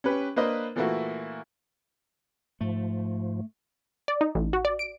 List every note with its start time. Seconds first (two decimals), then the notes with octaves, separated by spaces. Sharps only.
0.04 C#4 G4 B4
0.36 A#3 D4 B4 C5 D#5
0.76 A#2 E3 A3 A#3 E4 F#4
2.61 G#2 F3 A3
4.08 D5
4.21 D#4
4.35 A1
4.53 F#4
4.65 D5
4.79 D7